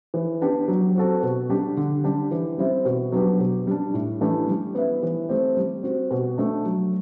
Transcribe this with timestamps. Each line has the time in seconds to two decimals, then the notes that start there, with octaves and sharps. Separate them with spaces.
0.14 E3
0.41 B3 D4 G4
0.68 F#3
0.96 C4 F#4 A4
1.23 B2
1.49 G3 D4 G4
1.77 D3
2.04 G3 D4 G4
2.31 E3
2.58 G3 C4 E4
2.85 B2
3.12 F#3 B3 D4 G4
3.40 B2
3.67 G3 D4
3.94 A2
4.21 E3 A3 D4 G4
4.48 G3
4.75 B3 E4
5.03 E3
5.29 A3 C4 G4
5.57 G3
5.83 C4 F#4
6.11 B2
6.38 A3 D4
6.65 F#3